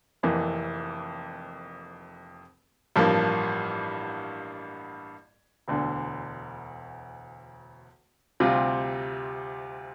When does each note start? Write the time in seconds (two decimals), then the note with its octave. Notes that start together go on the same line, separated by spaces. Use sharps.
0.23 F1 F2 E3 A#3
2.96 A1 G2 F3 A#3
5.68 E1 D2 D3
8.40 D2 C3 G3 C4 F4